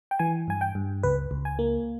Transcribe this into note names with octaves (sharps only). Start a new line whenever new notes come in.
G5
E3 G#5
G2 G#5
G5
G2
C#2 B4
C#2
G#5
A#3